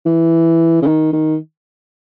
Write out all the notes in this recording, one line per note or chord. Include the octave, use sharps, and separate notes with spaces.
E3
C#3
D#3
D#3